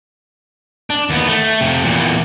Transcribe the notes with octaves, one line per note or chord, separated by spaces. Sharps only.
D4
D#2 B3
A3
F2 C3
E2 A#2